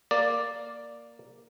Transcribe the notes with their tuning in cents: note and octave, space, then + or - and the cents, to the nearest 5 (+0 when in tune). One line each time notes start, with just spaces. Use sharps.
A#3 +0 D5 +0